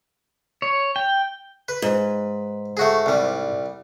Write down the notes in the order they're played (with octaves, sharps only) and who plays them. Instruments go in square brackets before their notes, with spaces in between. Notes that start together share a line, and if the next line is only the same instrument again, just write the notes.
[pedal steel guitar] C#5
G5
[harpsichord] B4
[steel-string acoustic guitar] G#2
[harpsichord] A3 F#4 G#4
C2 G3